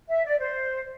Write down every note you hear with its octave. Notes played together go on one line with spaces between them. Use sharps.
E5
D5
C5